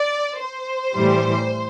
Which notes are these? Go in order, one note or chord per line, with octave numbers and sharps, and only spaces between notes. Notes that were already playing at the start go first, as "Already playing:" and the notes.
Already playing: D5
C5
A2 E3 G3